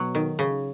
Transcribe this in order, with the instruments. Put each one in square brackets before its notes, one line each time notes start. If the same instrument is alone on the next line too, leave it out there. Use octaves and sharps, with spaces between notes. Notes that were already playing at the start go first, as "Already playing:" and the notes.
Already playing: [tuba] B2 [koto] F#3
[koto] D#3
C#3